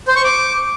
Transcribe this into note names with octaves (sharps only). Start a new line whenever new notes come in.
C5
C#6
D6